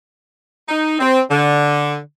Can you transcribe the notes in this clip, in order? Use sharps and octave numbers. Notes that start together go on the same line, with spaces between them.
D#4
C4
D3